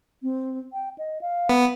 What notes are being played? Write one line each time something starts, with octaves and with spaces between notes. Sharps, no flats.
C4
G5
D#5
F5
B3